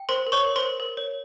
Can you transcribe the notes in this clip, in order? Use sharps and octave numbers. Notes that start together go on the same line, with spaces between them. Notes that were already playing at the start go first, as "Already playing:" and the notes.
Already playing: G5
A#4 C5 C6
A#4
C#5 C#6
A#4
C5 C6
A#4
A#4
C#5